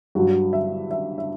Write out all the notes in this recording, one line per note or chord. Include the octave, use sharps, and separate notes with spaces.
G2 F#3 F#4
E5
E5
E5